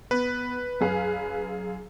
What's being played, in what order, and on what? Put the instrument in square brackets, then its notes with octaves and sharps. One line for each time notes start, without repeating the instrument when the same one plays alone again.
[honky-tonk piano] B3 [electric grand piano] B4
[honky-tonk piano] F#2 G#4 F5